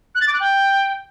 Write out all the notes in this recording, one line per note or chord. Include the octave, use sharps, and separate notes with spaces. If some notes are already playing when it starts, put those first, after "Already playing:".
F#6
A6
D6
F#6
G5